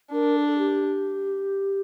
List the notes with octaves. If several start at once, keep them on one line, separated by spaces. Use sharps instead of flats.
D4 A#4
A4
A4
G4